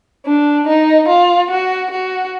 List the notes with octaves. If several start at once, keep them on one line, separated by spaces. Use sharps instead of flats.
D4
D#4
F4
F#4
F#4